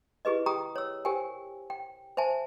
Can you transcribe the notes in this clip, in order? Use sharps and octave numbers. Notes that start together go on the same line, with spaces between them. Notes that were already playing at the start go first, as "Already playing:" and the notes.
E4 G4 G#4 B4 D#5
G4 G#4 G5 A#5 D#6
C#5 E6
G4 A#4 C5 G5 G#5
G5
C5 E5 G#5 A5